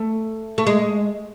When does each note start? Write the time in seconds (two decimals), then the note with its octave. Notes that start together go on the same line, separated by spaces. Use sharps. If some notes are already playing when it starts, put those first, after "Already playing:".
Already playing: A3
0.58 A3
0.67 G#3